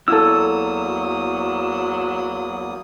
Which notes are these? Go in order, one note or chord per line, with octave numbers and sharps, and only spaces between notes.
E2 F#3 A#3 E4 A4 D#6 E6